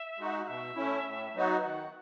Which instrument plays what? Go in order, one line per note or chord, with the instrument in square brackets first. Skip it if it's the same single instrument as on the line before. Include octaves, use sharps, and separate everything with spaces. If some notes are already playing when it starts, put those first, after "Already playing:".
Already playing: [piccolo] E5
[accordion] G#3 D#4 F#4
[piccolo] F#5
[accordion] B2 [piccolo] E5
[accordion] A3 C#4 E4
A2
F#3 B3 D#4 F#4
[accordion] D#3 [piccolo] F#5